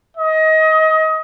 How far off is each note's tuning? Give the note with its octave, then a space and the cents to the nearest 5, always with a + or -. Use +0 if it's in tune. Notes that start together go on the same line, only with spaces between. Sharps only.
D#5 +25